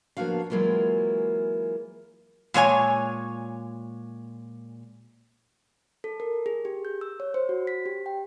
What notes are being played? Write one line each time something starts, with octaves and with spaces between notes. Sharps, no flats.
F3 A#3 B3 D4 F#4 F5
E3 F#3 G#3 A#3 E4 F4
A#2 G#3 C#5 G#5
A4
A#4
G#4
G4
G6
E6
C#5
C5
F#4
B6
G4
G5